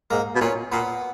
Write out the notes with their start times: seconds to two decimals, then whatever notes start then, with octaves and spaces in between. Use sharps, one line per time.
0.10 G#2 A#3 A#4
0.35 B2
0.41 A#2 C#4 C#5
0.72 A#2 B3 B4